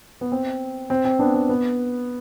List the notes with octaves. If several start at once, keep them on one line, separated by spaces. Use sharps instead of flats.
B3
C4
C4
C4
B3 D4
C4
B3